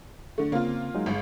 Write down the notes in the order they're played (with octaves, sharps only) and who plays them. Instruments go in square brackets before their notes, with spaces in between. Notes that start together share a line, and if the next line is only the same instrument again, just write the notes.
[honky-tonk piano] D3 A3
[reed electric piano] C#3 C4 [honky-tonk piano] A#3 F4
[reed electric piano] F#3 G#3 D#4
[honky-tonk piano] G1 C#2